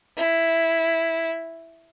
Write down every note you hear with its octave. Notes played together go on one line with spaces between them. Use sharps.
E4